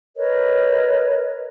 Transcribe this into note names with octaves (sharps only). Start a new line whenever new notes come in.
A#4 B4 C#5 D#5